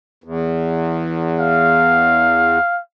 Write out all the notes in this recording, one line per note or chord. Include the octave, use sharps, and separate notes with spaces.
E2
F5